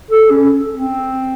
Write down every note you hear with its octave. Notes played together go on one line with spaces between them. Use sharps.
A4
C#4
C4